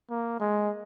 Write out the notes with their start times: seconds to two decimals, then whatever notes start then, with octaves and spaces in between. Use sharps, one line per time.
0.10 A#3
0.40 G#3